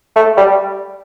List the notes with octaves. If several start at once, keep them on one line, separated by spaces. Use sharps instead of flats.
A3
G3